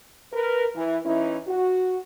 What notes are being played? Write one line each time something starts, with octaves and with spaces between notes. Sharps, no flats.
A#4 B4
E3
E3 C#4 D#4 E4
F#4